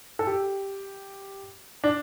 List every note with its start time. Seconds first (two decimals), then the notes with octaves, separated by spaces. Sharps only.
0.19 A4
0.27 G4
1.84 D4